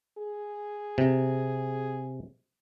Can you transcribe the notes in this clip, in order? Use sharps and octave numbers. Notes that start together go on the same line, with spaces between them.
G#4
C3